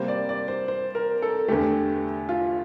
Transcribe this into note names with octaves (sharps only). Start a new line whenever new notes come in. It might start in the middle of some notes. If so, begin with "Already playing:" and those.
Already playing: C3 G3 A#3 C5
D5
D5
C5
C5
A#4
A4
E2 D3 A3 G4
F4